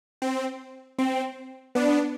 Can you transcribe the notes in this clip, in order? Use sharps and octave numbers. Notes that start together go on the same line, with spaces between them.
C4
C4
B3 D4